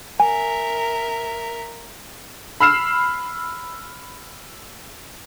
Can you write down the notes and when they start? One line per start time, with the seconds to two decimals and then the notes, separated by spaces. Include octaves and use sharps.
0.20 A#4 E5 G#5
2.60 B5 E6 F6 C7 E7